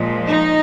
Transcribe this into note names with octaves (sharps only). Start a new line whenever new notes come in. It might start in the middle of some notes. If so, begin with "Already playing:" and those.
Already playing: A#2 F3 G#3
D#4